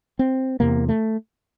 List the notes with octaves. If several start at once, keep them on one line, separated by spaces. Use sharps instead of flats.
C4
E2 C3 A#3
A3